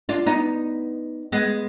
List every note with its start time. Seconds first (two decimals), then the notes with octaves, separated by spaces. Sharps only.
0.09 D4 F4
0.26 B3 D#4
1.32 G#3 B3